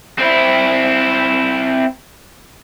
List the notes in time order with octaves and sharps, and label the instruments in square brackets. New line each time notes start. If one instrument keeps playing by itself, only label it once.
[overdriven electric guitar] C4 E4